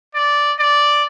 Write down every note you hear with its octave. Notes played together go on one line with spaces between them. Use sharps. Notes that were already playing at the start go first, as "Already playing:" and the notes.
D5
D5